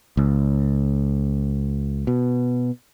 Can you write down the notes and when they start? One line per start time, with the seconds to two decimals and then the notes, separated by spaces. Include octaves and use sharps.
0.17 C#2
2.07 B2